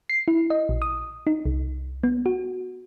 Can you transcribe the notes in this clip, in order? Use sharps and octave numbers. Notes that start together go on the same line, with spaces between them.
C7
E4
D#5
A#1
D#6
D#4
C2
B3
F#4